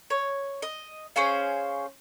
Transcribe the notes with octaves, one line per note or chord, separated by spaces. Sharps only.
C#5
D#5
C#4 G#4 C5 F5